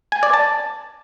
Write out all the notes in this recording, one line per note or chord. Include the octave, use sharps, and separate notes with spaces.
G#5
D5
A5